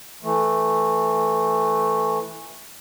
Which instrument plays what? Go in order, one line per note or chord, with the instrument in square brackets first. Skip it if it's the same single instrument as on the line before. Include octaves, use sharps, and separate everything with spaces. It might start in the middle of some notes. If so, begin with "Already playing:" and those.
[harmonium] E3 A3